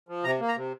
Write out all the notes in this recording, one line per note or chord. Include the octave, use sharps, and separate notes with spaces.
F3
C3 A#5
A#3
A#5
C3